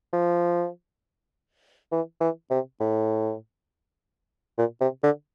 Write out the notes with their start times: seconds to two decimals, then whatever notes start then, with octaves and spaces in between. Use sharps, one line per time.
0.13 F3
1.92 E3
2.20 E3
2.50 C3
2.80 A2
4.58 A#2
4.81 C3
5.03 D3